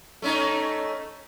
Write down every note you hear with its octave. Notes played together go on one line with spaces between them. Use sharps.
A3 C#4 D#4